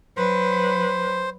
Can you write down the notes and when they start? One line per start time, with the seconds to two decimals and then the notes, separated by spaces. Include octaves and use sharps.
0.17 F#3 B4 C5